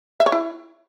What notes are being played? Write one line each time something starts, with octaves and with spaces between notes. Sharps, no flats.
E5
C#5
E4